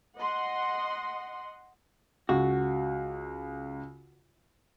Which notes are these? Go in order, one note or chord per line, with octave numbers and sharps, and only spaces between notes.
D#5 F#5 C6
C#2 F#4